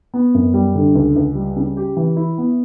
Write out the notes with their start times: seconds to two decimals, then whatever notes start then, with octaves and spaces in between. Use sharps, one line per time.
0.14 B3
0.34 F#2
0.54 G3
0.75 D3
0.95 C#2
1.16 C#2
1.35 G3
1.57 C#3
1.77 G4
1.97 E3
2.16 E4
2.38 B3